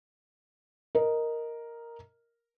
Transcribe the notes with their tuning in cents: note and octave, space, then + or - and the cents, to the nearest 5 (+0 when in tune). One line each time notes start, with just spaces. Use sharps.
A#4 +0 D#5 +0